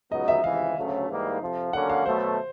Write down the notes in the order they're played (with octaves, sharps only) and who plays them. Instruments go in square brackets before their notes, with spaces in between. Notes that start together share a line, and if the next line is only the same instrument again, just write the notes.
[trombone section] C#2 B2 F#3 B3 D#4 [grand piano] D#5
[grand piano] E5
[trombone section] C#2 C3 E3 [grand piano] F5
[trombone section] D2 C#3 F#3 A3 C#4
G#2 E3 G3 A#3 D#4
F2 C3 F3
[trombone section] D3 F#3 A#3 C#4 F#4 [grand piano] F#5
[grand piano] F5
[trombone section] B2 F#3 A3 [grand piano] C5